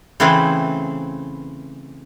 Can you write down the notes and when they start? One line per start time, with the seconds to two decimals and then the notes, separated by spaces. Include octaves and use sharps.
0.20 C#3 E3 A3 C4 B4